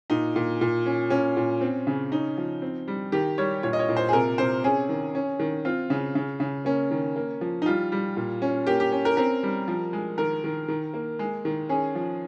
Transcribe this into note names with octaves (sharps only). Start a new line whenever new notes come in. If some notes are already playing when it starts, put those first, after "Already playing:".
A#2 D#4
A#2
A#2
C#4
A#2 C#4
A#2
C4
C#3
C#4 D#4
F3
C4
G3
D#3 G4
G3 C#5
A#2 C#5
D#5
C#5
A#2
C5
G#4
C3 A#4
C3 C5
C#4 G#4
D#3
C#4
D#3
C4 F4
C#3
C#3
C#3
A#3 C#4
D#3
A#3
F3
D#4
G3 F4
G3
A#2
C#4
A#3 G4
G4
C#4
A#4
C4 A#4
G3
F3
G#3
D#3 A#4
D#3
D#3
A#3
G#3
D#3
C#4 G#4
F3